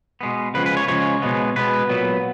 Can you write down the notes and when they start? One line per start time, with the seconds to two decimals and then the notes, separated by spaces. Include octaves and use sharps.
0.21 B2 G#3 B3
0.54 C#3 F3 G#3 B4
0.66 B4
0.77 C#5
0.88 C#3 F3 G#3 C#5
1.22 B2 G#3 B3
1.56 B2 G#3 B3 B4
1.89 A#2 F#3 B3